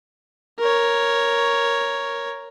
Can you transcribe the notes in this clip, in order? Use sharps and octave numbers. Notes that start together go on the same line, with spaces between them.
A#4 C#5